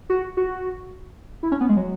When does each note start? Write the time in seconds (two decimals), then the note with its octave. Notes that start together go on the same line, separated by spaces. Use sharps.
0.10 F#4
0.37 F#4
1.43 E4
1.52 C#4
1.61 B3
1.69 G#3
1.77 F#3